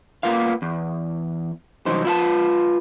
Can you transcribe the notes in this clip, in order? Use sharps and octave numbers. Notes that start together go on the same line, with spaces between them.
A#3 B3 F4 F5
E2
C2 E3 F#3 D#4 C5
E4 F4 B4 A5